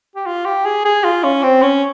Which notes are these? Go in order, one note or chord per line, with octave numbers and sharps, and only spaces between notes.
G4
F4
G4
G#4
G#4
F4
C#4
C4
C#4